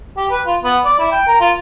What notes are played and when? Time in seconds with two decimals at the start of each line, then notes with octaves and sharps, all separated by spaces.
0.17 G4
0.31 B4
0.46 F4
0.63 B3
0.85 D5
0.99 E4
1.12 G5
1.28 A#4
1.40 F4